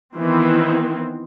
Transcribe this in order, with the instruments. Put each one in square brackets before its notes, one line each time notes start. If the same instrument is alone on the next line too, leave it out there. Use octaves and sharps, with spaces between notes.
[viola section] D#3 E3 B3 C4